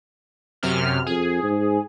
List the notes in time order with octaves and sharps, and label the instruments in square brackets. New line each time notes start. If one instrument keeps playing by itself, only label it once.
[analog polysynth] F#2 C3 F6
[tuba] F2 [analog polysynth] G#4
[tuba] G#2